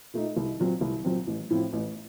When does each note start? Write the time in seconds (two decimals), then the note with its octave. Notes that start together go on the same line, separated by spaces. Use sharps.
0.14 A#2 A3 D#4
0.37 C2
0.60 A#2 F#3 C4
0.81 C2
1.05 A#2 F#3 C4
1.27 A1
1.50 A2 F3 C4
1.73 A1